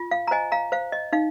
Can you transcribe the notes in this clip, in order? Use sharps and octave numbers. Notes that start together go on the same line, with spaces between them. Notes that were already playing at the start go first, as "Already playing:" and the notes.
Already playing: F4
F5
A#5
C5 D#5 G#5
F5 A#5
C5 F5
D#5
D#4 F5